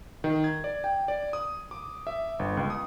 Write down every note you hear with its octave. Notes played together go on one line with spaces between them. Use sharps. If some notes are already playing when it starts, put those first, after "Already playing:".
D#3
G#6
D5
G5
D5
D#6
D6
E5
G1
C#2
D#6